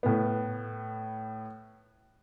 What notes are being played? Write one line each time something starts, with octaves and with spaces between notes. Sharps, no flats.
A2 B3